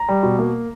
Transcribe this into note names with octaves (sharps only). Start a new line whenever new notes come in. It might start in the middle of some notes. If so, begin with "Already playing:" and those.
Already playing: A#5
G3
B2
A#3